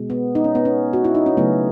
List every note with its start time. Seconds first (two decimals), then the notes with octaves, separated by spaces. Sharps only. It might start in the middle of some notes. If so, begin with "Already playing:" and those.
Already playing: B2 G#3
0.10 B3
0.35 D#4
0.44 C#4
0.55 B3
0.65 C#4
0.93 F#4
1.04 E4
1.15 D#4
1.26 C#4
1.37 C#3 F#3 A3 B3